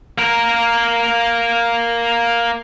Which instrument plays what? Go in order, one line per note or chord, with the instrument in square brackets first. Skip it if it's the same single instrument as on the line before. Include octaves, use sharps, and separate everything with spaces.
[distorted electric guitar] A#3 A#4